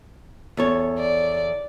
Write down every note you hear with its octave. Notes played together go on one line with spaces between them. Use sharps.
E2 A4 C#5
D5